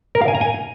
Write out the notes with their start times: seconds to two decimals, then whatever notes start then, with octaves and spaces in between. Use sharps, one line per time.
0.15 A#4
0.22 F5
0.28 G#5
0.35 A#5
0.41 G#5